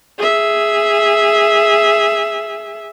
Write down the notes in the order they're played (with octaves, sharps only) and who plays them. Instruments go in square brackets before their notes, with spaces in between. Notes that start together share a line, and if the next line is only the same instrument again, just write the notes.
[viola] G#4 E5